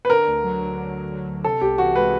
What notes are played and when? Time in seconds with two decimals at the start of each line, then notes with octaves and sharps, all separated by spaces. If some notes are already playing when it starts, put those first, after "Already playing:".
0.05 B4
0.09 D3 A#4
0.27 D2
0.43 F#3
0.60 D2
0.77 D3
0.94 D2
1.11 F#3
1.27 D2
1.44 C3 A4
1.61 C2 G4
1.78 E3 F#4
1.95 G#3 B4